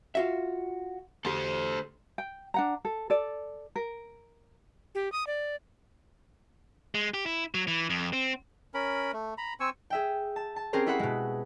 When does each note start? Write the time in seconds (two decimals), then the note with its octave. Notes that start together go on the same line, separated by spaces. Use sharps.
0.15 F4 F#4 E5
1.25 D2 G4 A4 C5
2.18 G5
2.54 D4 F#5 A#5
2.85 A4
3.10 A4 D5
3.76 A#4
4.95 G4
5.12 D#6
5.27 D5
6.95 G#3
7.14 G4
7.26 E4
7.55 F#3
7.68 E3
7.90 F2
8.13 C4
8.74 C#4 A#4 B5
9.13 A3
9.38 A#5 B5
9.60 C4 G#5 C#6 E6
9.90 G#4 E5 G5
10.36 A5
10.56 A5
10.73 C4 C#4 G4 G#4 A#4 C5
10.86 E4 G#4 C5 E5 F#5 B5
10.99 B2 G#3